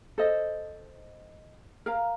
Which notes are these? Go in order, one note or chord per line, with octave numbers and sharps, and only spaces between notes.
A4 C5 D#5
A#4 F5 A#5